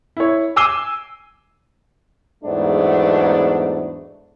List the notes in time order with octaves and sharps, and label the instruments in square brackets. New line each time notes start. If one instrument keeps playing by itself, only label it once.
[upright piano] E4 C#5
G#5 D6 E6 C7 D#7 G7
[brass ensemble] E2 G#2 F#3 A3 B3 D4